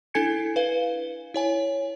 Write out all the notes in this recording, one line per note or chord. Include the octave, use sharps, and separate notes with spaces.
D4 E4 A4 G#5 G#6 C#7
B4 F5 G7
E4 C#5 G#5